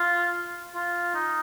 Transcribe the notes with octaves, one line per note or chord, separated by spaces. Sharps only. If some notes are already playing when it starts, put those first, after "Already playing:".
Already playing: F4
F4
D#4